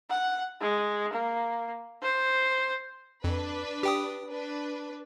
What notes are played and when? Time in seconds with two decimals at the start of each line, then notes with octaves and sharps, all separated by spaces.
0.10 F#5
0.61 G#3
1.13 A#3
2.02 C5
3.24 F2 D4 B4
3.83 G4 G5 D#6
4.28 D4 B4